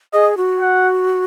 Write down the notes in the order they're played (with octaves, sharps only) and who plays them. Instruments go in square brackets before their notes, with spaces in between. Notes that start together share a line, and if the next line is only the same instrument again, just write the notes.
[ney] G#4 [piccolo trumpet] D#5
[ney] F#4
[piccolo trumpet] F#5